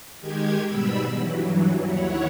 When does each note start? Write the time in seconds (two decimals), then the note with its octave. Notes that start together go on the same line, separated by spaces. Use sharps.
0.21 D#3 G#3 G4 G#6
0.67 G#2 B2 G3 B5 E6
1.14 G2 E3 F#3
1.86 D#2 E4 C#5 F#5